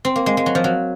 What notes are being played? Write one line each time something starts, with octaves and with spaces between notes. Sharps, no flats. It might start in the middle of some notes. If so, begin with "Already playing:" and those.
C4
A#3
G#3
G#3
F#3
F3
F#3